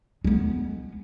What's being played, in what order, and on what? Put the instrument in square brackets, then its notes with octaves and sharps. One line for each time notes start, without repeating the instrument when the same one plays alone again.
[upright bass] G#3 B3